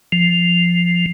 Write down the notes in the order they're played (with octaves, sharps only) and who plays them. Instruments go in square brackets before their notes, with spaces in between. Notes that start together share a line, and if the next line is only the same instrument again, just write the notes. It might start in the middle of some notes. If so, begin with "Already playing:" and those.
[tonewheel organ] F3